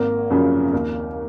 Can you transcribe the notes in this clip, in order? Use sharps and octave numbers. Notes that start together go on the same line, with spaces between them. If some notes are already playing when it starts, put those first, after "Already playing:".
Already playing: G#1 A#3
F#2 C#3 F3
D#2